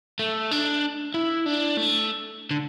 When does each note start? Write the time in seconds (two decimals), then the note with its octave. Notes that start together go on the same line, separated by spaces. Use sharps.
0.19 A3
0.51 D4
1.14 E4
1.46 D4
1.77 A3
2.51 D3